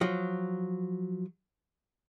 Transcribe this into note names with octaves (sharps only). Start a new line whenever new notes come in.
F3 F#3